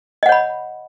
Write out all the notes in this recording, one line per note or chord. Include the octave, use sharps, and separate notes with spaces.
C#5 D#5 F#5 B5